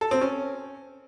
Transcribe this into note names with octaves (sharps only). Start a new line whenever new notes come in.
A4
C4
C#4